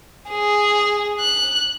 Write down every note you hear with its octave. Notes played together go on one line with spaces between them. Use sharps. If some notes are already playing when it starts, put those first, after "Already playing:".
G#4
F#6